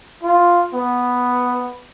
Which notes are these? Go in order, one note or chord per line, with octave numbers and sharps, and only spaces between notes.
F4
B3